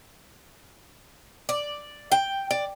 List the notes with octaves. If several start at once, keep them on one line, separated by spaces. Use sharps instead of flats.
D5
G5
D5